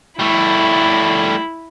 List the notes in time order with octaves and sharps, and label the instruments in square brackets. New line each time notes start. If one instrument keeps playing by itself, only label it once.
[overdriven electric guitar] G3 A3 [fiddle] E4